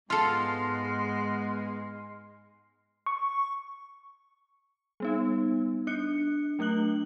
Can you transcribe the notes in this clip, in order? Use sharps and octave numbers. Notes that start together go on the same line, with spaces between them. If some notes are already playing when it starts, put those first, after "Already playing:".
G#2 G#3 B3 F4 A4 C6 F6 C7
C#6
G3 B3 D#4
D4 F#6 C#7
F#3 A3 D4 F#6 F#7